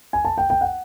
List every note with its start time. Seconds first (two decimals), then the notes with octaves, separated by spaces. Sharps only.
0.13 G#5
0.25 A5
0.38 G5
0.50 G5
0.61 F#5